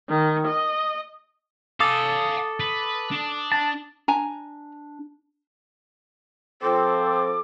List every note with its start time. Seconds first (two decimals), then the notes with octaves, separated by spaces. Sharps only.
0.10 D#3
0.47 D#5
1.80 A4 F5 G#5 D6 D#6 A6
2.60 B4
3.11 D4
3.52 A5
4.08 D4 G#5 A#5
6.62 F3 C4 A4 D6